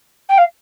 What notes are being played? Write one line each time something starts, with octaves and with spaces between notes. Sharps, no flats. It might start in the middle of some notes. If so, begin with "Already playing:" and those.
G5
F5